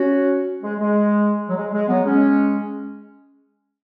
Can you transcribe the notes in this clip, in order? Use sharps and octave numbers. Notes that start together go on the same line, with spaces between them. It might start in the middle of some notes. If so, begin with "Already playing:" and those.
Already playing: C#4 F#4
G#3
G#3
F#3
G#3
G#3
F#3 B3
G#3 C#4